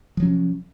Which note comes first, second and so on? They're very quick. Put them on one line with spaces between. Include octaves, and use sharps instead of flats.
F3 F#3 C#4 C3